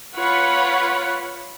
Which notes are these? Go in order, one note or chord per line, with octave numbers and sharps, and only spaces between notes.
F4 B4 C#5 F#5 B5